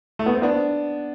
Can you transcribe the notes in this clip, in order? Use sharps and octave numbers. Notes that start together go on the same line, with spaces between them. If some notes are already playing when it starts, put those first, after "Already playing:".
A3
B3
C4
B3 D4